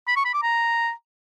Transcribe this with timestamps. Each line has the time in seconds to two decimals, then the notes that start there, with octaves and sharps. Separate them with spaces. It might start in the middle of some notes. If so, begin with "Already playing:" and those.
0.08 B5
0.16 C#6
0.25 B5
0.34 D6
0.42 A#5